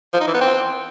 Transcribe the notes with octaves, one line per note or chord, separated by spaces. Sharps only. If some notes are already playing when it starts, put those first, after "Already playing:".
F3
D#4
E3
B3
C4